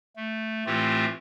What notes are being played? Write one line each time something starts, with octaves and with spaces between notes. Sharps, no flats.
A3
A2 E3 A3 C4 F4 G4